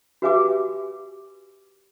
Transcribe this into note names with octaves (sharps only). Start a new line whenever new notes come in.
F#4 G4 B4 E5 G#5 D6